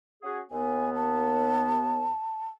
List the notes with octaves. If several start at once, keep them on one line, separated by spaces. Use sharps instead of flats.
C#4 F#4 G#4
D#2 B3 G#5
A5